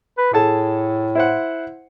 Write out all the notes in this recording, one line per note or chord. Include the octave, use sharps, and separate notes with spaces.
B4
A2 G#4 A4 A5
E4 C5 F#5